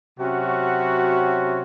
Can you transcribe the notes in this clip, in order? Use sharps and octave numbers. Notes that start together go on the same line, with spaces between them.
C3 F#3 C#4 F#4